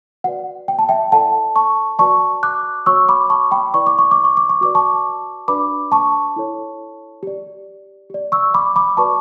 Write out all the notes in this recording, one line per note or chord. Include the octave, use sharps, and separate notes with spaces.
F#4 B4 D5 F#5
G5
A5
E5 G5
E4 A4 D5 F#5 A5
A5 C#6
F#4 B4 D5 A5 C#6
D6 F#6
F#4 C#5 C#6 E6
B5 D6
A5 C#6
G5 B5
E4 B4 D5 C#6
D6
C#6
D6
C#6
D6
C#6
F#4 B4 D5 D6
A5 C#6
D4 F#4 B4 D5 B5 D6
A5 C#6
E4 A4 C#5
G4 D5
G4 D5
C#6 E6
B5 D6
B5 D6
F#4 B4 D5 A5 C#6